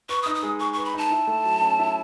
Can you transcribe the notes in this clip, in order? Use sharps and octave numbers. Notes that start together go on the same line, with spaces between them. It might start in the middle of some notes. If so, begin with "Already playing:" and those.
B4 C#6
D#6
D#4
D#6
G#3
G#4 C#6
B4 C#6
B5
D#4 A5
E4
A3
F#3
C#4
E4